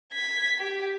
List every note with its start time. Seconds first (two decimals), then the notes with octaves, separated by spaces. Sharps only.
0.13 G#6 B6
0.59 G4